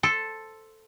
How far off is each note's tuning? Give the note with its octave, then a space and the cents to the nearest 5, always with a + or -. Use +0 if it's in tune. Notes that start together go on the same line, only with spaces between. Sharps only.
A4 +0 C5 +0